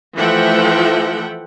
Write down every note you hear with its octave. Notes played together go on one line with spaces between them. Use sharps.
E3 F3 A3 E5 F#5 G5